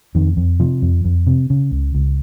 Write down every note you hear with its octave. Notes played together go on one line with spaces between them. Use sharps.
F2 D#3
F2
C3 F3
F2
F2
C3
C#3
C#2
C#2